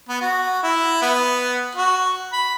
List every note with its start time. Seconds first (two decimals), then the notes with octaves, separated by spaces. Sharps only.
0.09 B3
0.22 F#4
0.63 E4
1.02 B3
1.75 F#4
2.33 B5